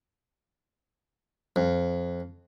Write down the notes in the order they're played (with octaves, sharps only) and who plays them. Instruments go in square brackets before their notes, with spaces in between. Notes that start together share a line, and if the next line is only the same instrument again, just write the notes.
[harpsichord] F2